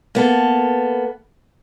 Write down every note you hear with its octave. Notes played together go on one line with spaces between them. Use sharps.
A#3 B3 A4